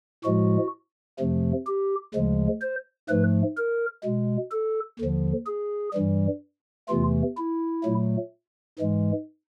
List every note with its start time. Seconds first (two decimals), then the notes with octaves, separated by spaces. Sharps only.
0.24 A2 F3 G#3 F#4
1.19 F2 C3 F3 A3
1.67 G4
2.14 D2 C#3 F3 G#3
2.62 C5
3.09 G#2 F3 A3 B4
3.57 A#4
4.04 B2 G#3
4.52 A4
4.99 D#2 D3 F3
5.46 G#4
5.94 G2 E3 G3
6.89 E2 C3 E3 A3 F4
7.37 E4
7.84 A#2 F#3 A3
8.79 G#2 E3 G#3